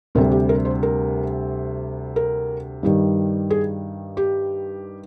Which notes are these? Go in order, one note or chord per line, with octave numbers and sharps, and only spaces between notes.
D2 C3 G3 A#4
G4
A#4
C5
A#4
A#4
G2 D#3 G3
G#4
G4